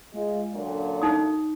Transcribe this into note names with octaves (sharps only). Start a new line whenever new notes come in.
G#3 F4
F#2 A#2 D3
D#4 D#6